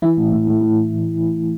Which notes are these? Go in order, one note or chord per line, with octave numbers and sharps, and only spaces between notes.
E3 E4
A2
A2
A2
A2